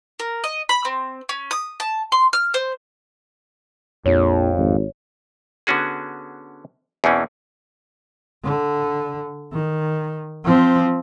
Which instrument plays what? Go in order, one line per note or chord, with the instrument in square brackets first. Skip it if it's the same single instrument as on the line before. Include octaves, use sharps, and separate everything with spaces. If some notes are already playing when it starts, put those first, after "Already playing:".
[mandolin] A#4
D#5
B5
C4
C#4
D#6
A5
C6
F6
C5
[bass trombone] A#1 [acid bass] F2 [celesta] C#5
[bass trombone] G#1
[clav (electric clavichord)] D3 B3 C#4 F#4 G#4
E2 B2 E3 C4 C#4
[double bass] D3
D#3
F3 C4